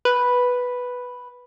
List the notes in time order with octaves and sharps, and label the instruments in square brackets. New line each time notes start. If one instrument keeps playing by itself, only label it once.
[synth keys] B4